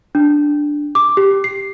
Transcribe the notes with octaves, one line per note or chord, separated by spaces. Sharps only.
D4
D6
G4
C7